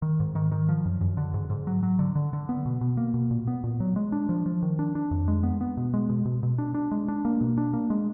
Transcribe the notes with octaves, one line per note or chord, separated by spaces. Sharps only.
D#3
G#2
D#3
D#3
F3
F#2
F#2
D3
G#2
G#2
F#3
F#3
D3
D3
D3
B3
B2
B2
A#3
B2
A#2
B3
A#2
F#3
G#3
D4
F3
F3
D#3
D4
D4
F2
G#3
B3
B3
B2
G#3
B2
B2
B2
D4
D4
G#3
D4
A#3
B2
D4
A#3
G#3